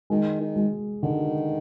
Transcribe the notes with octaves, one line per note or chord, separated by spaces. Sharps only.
D#3 G#3
D#3
G#3
D3 D#3